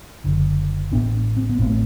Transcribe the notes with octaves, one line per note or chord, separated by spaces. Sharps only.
F#1 F#2 D3
A1 A2 B3 D4
C4
B3
A1 A2 A3 C4